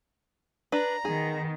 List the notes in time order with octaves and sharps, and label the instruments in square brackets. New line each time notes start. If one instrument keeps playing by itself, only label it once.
[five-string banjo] D4 B4 [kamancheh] A#5
[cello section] D#3 B3 [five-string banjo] G#4